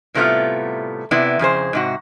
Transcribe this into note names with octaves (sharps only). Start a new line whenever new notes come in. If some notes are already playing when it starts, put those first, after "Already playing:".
A2 C3 G3 A3 B3 F4
C3 B3 E4 D5
F2 C#3 G#4 C5
G#2 C3 F#4